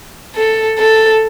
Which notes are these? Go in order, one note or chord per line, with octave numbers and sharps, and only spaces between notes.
A4
A4